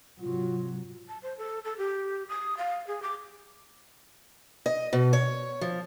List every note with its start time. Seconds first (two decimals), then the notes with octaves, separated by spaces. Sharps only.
0.22 G#2 C3 F#3 F4
1.08 A5
1.22 C5
1.38 A4
1.65 A4
1.78 G4
2.29 D#6
2.57 F5
2.87 G#4
3.02 D6
4.66 D#5
4.93 B2
5.13 C#5
5.61 F3